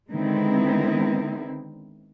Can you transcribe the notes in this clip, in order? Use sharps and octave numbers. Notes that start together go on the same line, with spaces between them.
D3 D#3 G#3 B3 C4 E4